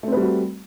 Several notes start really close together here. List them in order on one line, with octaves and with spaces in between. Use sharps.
A3 C4 B4 G3 F#4